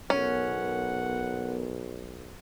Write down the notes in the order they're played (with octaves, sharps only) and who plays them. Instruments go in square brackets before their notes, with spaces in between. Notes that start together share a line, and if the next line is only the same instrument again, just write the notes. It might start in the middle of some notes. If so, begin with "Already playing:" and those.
[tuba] B1 [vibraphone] B3 A#4 [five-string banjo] C#4 [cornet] F#5